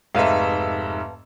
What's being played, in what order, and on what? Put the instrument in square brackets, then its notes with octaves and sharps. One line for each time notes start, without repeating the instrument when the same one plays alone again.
[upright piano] F1 G#2 E5 [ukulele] A4 B4 F5